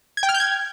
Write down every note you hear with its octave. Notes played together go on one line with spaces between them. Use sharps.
G#6
G5
F6
G6
G#6